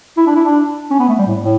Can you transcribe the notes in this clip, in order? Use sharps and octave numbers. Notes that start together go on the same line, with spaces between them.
E4
D4
E4
D4
C#4
B3
A3
G3
A2
A2